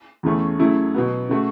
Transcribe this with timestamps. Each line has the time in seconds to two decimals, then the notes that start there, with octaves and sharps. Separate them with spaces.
0.23 E2 C#3 A3 C#4
0.59 C#3 F#3 A3 E4
0.94 B2 F#3 B3
1.29 C#3 A3 F#4